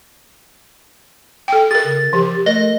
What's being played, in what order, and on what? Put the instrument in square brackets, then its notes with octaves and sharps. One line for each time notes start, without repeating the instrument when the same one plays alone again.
[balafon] A4 G5
[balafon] G#4 A#4 [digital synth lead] A6
[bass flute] C#3
[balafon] F3 [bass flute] G4
[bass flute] A3 [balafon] A#4 [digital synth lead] D#5